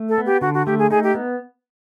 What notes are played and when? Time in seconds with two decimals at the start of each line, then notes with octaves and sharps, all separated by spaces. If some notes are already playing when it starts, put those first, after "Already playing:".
Already playing: A3
0.09 A4
0.18 B3
0.26 G4
0.41 D3 F#4
0.54 F#4
0.66 A3 G4
0.79 G#4
0.91 D#4 G#4
1.03 G4
1.14 B3